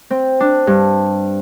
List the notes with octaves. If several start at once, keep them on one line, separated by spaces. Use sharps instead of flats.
C4
D4
G2